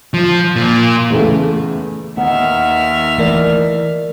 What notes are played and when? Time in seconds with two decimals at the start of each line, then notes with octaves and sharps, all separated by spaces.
0.14 F3
0.56 A#2
1.11 E2 C#3 A3
2.17 D#2 D#3 B3 E5 F#5 F6
3.18 E3 A3 A#4 D5